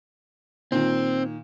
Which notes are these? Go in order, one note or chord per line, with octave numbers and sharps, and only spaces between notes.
A#2 D#3 C4